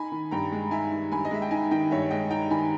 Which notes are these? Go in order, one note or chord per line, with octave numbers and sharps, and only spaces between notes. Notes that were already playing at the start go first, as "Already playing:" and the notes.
Already playing: D#4 G#5 B5
D#3
G2 G5 A#5
G#3
D#4 E5 G#5
D#3
G2 G#5 B5
D#5
G#3 E5
G5
D#4 E5 G#5
D#3 D#5 G5
G2 C#5 E5
G#3 D#5 G5
D#4 G5 A#5
D#3 G#5 B5